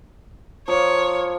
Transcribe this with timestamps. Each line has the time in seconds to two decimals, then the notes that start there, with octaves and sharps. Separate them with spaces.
0.68 F3 A#3 C#5